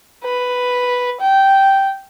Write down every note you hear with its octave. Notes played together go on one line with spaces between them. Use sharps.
B4
G5